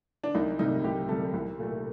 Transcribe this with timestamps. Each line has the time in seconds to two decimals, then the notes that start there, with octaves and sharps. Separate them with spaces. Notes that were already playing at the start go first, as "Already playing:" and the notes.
0.24 D4
0.35 C2 D#4
0.59 C3 G3 D#4
0.84 C2 G4
1.09 C3 G3 A4
1.34 C2
1.59 A#2 A3